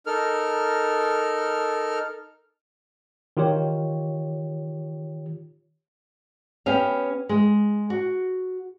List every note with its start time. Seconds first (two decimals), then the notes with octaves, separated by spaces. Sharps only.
0.06 D#4 A4 A#4 F6
3.37 D#3 F4 G4 C#5
6.66 B3 C#4 G4 F5
7.29 G#3
7.90 F#4